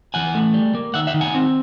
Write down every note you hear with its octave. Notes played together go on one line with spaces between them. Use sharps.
E3 F#5 G#5
A3
G3
A#3
D#3 E5 F#5
E5 F#5
D#3
F#5 G#5
C4